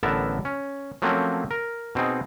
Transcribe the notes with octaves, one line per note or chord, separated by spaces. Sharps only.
A1 D3 B3 A#4 E5 A5
C#4
F3 F#3 A3 A#3 C4 C#4
A#4
B2 C4 D#4 G#4